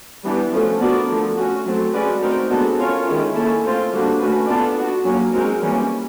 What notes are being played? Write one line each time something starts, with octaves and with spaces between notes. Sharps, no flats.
E3 G3 B3 D4 G4
F3 A3 C#4 F#4 A4
B3 D4 F#4 A#4 D5
D3 F3 A3
A3 C#4 F#4
F#3 A3 C4
G#3 C#4 F#4 B4 D5
A3 C4 D#4 F#4 A#4
G#3 B3 D4 F#4 A4
C#4 F4 A#4 C#5
D#3 G#3 C#4 E4
A#3 C#4 E4 A4
A3 C4 F4
D3 G3 A#3 D4 F#4
A3 C#4 F#4 B4
B3 D4 F4 A4 D5
B3 D4 F#4
F#3 A#3 C#4
G#3 C4 D#4 F#4 A#4
E3 G3 A#3 C#4